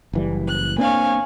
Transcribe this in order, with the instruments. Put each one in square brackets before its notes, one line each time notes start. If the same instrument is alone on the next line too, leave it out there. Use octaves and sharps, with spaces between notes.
[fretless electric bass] F#1 E3 G3
[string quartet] F#6
[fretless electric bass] A#3 C4 D4 [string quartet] C#5 F5 G#5